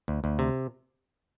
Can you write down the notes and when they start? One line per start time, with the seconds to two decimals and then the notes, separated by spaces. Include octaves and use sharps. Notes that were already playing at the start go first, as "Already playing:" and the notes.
0.08 D2
0.24 D2
0.39 C3